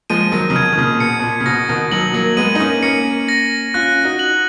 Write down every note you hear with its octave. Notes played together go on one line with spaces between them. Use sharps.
F3 G#3 D#7
D#3 F#3
C#3
B2 G#6
D#3
A#2 C#3
B2 C#7
B2
A#2
C#3
B2 A#6
B2 D#3
D#3 F#3 F#7
F#3 A#3
G#3 B3 D#7
D#4
A#3 C#4
A#3 C#4 C#7
A#6
C#4 F4 F#6
D#4 F#4
F#7